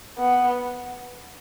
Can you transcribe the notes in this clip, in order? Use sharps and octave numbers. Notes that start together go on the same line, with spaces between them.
B3